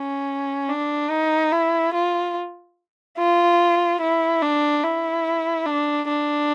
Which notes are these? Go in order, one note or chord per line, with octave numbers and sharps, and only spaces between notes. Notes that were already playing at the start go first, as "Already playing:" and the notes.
Already playing: C#4
D4
D#4
E4
F4
F4
E4
D4
E4
D4
D4